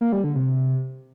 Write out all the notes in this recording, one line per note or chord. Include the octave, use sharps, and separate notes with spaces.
A#3
G3
D3
C3